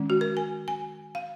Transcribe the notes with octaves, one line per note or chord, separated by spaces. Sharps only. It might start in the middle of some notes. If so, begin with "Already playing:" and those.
Already playing: D#3 G#3 C#4
F#4
A#4
G#5
G#5
F5